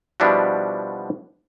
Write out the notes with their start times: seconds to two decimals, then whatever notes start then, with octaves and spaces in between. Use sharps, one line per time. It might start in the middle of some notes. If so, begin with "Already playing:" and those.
0.20 B2 F3 G3 D4 E4 F#4